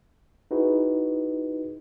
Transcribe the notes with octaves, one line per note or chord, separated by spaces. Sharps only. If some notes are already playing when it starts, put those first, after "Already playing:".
D#4 E4 F#4 G#4 B4